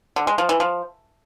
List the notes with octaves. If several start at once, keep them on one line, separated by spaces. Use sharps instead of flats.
D3
G#3
F3
E3
F3